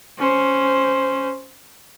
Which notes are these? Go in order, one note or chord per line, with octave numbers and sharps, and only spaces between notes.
C#4 C5